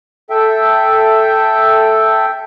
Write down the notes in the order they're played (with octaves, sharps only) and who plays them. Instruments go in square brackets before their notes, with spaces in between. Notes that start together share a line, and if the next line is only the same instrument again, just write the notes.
[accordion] A4 E5 G5